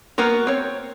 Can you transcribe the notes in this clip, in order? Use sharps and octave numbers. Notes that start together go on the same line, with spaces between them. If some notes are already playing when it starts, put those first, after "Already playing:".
A#3 B3 F#4 A#4
C4 C#5